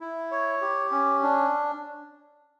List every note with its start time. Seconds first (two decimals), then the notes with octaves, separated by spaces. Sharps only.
0.01 E4
0.31 C#5
0.62 G4
0.91 C#4
1.22 D4